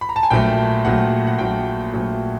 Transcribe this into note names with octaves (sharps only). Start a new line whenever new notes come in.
B5
A#5
A5
G#5
A#1 A#2 F#3 A3 G5
A#1 A#2 F#3 A3 F#5
F#5
A#1 A#2 F#3 A3 G5
A#1 A#2 F#3 A3